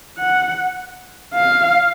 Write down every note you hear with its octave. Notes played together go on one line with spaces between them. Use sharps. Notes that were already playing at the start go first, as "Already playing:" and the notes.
F#5
F5